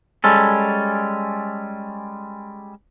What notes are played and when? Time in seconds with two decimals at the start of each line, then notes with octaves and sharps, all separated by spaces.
0.24 G3 G#3 C#4 A4